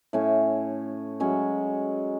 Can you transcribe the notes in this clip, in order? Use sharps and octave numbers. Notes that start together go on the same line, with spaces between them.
A2 C#4 F5
F#3 G#3 C#4